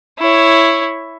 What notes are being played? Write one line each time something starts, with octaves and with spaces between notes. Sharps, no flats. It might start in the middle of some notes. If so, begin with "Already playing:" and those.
E4 C#5